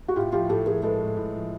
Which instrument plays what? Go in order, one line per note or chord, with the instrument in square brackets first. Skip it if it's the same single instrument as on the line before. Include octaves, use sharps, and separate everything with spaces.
[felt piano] F#4
[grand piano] A2 [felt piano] F4 G4
[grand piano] F3 [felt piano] F4 G4
[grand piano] A2 [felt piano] G4 A4
[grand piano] F3 [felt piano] G#4 A#4
[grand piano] G#3 [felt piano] A4 B4
[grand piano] A2
A2
F3